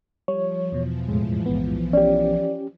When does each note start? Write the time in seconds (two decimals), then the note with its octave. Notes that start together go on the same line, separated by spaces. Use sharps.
0.28 F3 G3 C#5
0.72 E2 B2 E3 F3
1.08 F2 A2 G#3
1.46 B1 B3
1.93 C#4 G4 D5